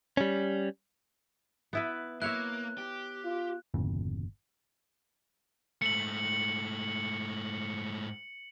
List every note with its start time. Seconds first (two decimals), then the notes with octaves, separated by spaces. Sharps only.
0.17 G3 C#4
1.73 B3 E4 B4
2.22 A#3 E4 C#5 E5 F#6
2.78 G4
3.25 F4
3.74 G1 E2 A#2 C#3
5.82 G#2 A3 C#7 F#7